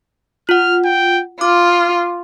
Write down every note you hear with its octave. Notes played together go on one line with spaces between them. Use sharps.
F4 F#5 F6
G5
F4 D6 F6